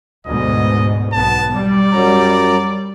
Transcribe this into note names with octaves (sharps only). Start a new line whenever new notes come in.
D2 G#2 B2 D#5
B1 B3 A5
G3 D5
F#2 F#3 A#5